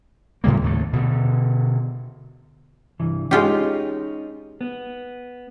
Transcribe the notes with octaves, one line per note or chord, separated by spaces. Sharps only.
A2 C#3 G3 A#3
D#2 A2 A3
B2 D3
C2 G2 E3
G#3 C#4 D#4 F4 G4
B3